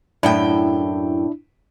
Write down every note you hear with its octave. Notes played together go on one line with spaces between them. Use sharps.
F#2 A2 D4 E4 G5